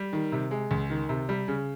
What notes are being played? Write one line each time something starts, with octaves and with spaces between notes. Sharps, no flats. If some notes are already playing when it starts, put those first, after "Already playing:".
Already playing: G3
D#3
C3
G#3
C#2
D#3
C3
G3
C#3